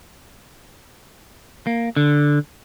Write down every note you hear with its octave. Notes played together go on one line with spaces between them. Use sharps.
A#3
D3